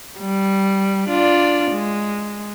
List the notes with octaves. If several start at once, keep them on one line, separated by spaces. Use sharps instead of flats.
G3
D4 F4 D5
G#3